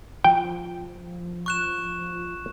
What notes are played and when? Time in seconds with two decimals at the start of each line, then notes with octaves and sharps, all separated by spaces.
0.24 F3 G5
1.46 C#6 F#6 E7